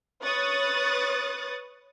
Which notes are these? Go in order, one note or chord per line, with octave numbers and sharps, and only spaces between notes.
B4 C#5 C#6 D#6 F#6 A6